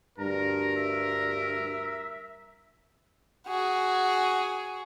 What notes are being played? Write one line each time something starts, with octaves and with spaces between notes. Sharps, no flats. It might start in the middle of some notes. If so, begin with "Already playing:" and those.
D2 G2 A#4 A#5
E5
F#4 G#4